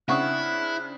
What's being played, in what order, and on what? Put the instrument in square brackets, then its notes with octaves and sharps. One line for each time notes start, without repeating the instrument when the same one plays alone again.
[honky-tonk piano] C#3 C4 D4 [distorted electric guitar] E4 [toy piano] F#5 C#6 D#6 [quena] F#6